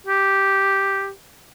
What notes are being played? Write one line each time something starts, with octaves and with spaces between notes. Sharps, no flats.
G4